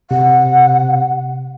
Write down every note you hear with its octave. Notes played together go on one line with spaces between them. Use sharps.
C3 F#5